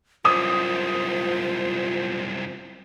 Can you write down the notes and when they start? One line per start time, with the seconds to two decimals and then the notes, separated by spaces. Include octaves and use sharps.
0.25 C2 F#2 F4 C5 D#6